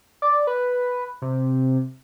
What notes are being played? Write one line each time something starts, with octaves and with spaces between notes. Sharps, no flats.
D5
B4
C3